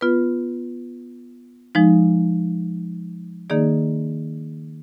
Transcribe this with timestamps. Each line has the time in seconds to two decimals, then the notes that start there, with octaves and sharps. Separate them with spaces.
0.01 B3 F4 B4
1.75 F3 G#3 D#4
3.50 D#3 A#3 D#4 G#4 D5